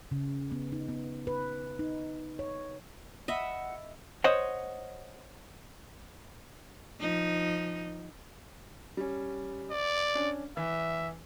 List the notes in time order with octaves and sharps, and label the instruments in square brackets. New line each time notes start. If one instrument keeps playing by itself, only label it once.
[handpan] C#3
B3
D#4
B3
B4
D#4
C#5
[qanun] D#5 E5 B5 [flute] F#5
[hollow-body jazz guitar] C5 C#5 D#5 F#5
[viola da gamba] F3 D#4
[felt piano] G3 C#4
[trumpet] D5
[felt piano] C#4 D4
[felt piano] E3 [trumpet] E5